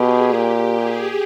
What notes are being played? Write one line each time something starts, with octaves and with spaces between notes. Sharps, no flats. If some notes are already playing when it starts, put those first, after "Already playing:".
Already playing: B2 G4 G#4
A#2 G4
G#4